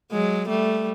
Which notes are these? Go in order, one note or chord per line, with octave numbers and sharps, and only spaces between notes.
F#3 G#3
G3 A3